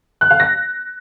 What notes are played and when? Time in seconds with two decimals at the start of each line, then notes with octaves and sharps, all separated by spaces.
0.21 F#6
0.30 F5
0.40 A#6